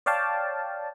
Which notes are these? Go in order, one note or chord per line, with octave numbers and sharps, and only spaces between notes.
C#5 D5 F5 G5 A5